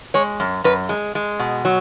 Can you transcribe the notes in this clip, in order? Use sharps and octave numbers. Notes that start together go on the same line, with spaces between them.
G#3 C#5
F#2
F#2 B4
G#3
G#3
B2
F#3